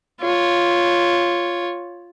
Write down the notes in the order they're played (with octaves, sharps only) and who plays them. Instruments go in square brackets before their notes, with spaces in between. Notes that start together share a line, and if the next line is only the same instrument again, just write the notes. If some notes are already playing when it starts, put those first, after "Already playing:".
[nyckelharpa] F4 C#5